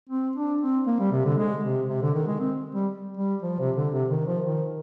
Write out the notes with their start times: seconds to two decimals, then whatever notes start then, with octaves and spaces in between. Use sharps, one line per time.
0.09 C4
0.36 D4
0.61 C4
0.86 A#3
0.99 G3
1.12 C3
1.25 D3
1.38 G#3
1.64 C3
1.89 C3
2.02 D3
2.14 D#3
2.27 G#3
2.40 C4
2.75 G3
3.17 G3
3.42 F3
3.59 C3
3.76 D3
3.93 C3
4.10 D#3
4.27 F3
4.44 D#3